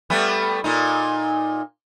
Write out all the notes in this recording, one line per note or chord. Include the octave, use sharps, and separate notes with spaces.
G3 A3 B3
A#2 D#4